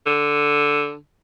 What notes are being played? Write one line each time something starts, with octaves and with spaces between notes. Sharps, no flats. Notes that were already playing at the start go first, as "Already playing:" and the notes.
D3